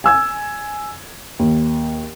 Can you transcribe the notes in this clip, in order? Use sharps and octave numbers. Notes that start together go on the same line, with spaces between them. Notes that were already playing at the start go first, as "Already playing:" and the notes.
G#5 E6 G#6
D#2